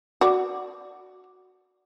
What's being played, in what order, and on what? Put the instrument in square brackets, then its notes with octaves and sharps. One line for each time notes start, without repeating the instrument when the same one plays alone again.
[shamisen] F#4 D5